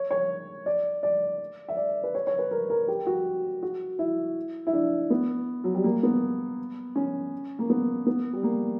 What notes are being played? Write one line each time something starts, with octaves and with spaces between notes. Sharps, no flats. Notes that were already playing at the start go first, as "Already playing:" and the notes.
Already playing: C#5
C#5
D5
D5
E5
D5
B4
C#5
C#5
B4
A#4
A#4
G4
F#4
F#4
E4
E4
D4
B3
F#3
G3
A#3
B3
C#4
A#3
B3
B3
G3
A#3